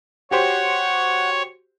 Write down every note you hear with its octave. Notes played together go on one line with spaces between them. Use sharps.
F#4 G4 C5 C#5 F#5